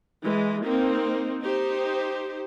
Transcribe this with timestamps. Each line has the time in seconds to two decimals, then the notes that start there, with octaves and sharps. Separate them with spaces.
0.24 E3 G#3
0.64 A#3 C4 D#4
1.42 D#4 G4 C5